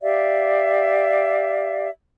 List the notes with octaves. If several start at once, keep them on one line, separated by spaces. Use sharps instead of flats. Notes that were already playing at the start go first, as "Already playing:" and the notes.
G4 D5 E5 F5